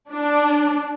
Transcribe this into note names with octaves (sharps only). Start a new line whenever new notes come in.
D4